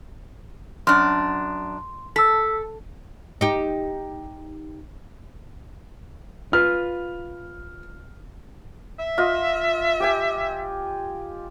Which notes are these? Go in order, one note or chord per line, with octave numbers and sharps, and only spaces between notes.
F#2 D4 C6
A4 E6 B6
D#4 G4
F4 B4 F6
E5
F4 D#5
G4 G5 G#5